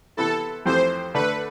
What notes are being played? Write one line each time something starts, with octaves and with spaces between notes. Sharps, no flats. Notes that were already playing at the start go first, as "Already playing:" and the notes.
C3 E3 B3 E4 A4 B4
F2 E3 A3 C4 G4 C5
D3 A3 D4 A4 B4